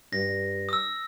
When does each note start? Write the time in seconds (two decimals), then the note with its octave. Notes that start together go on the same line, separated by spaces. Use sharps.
0.13 G2 A#6
0.69 D#6 E6